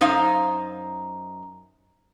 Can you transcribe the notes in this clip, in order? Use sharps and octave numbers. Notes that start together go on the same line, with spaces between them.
F#2 D#4 C5 F5